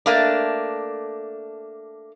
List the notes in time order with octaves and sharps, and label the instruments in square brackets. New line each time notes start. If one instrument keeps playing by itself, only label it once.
[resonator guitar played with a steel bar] A3 A#3 D4